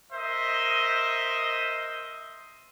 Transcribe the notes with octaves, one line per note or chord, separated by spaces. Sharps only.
A#4 C5 D#5 E5